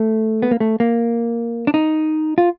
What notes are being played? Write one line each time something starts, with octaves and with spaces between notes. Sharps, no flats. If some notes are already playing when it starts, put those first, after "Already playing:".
Already playing: A3
B3
A#3
A3
A#3
D4
D#4
F4